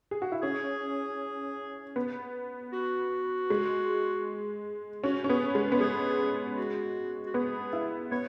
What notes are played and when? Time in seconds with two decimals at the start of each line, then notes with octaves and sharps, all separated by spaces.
0.11 G#4
0.22 F#4
0.32 E4
0.42 C#4 G#4
1.96 B3
2.73 F#4
3.50 G#3
5.03 C#4 F#4
5.24 C#4
5.29 B3 G#4
5.55 G#3
5.72 B3
5.80 G#3 G#4
6.57 F#4
7.27 F#4
7.34 B3 G#4
7.73 E4
8.11 B3 C#5